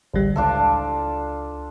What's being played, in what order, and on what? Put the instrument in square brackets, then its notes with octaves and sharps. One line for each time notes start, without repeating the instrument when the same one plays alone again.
[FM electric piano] A1 D2 G3
[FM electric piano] C#2 [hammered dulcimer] D4 F4 A4